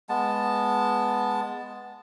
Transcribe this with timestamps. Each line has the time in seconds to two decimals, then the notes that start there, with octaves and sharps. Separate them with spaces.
0.09 G#3 B3 A5